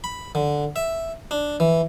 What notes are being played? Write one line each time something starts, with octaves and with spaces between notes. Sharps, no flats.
B5
D3
E5
D4
E3